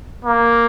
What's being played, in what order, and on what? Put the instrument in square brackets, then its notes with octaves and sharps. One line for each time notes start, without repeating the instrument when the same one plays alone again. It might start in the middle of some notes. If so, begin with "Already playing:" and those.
[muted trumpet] A#3